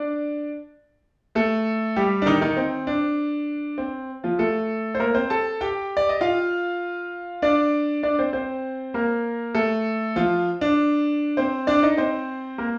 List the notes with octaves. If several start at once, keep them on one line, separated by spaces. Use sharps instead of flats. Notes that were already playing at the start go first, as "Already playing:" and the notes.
Already playing: D4 D5
A3 A4
G3 G4
D4
D#3 D#4
D#3 D#4
C4
D4
C4
F3 F4
A3 A4
C5
A#3 A#4
C4 C5
A4 A5
G4 G5
D5
D#5
F4 F5
D4 D5
D4 D5
C4 C5
C4 C5
A#3 A#4
A3 A4
F3 F4
D4
C4 C5
D4 D5
D#4 D#5
C4 C5
A#3 A#4